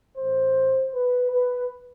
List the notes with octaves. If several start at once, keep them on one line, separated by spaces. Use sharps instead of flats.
A2 E3 A3 C5
B4
B4